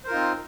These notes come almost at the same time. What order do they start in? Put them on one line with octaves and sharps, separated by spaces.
C5 A#4 F4 D#4 C4